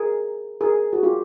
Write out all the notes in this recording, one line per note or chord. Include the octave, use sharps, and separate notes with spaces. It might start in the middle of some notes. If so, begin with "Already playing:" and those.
Already playing: G#4 A#4
G#4 A#4
F#4 G#4
F4 G4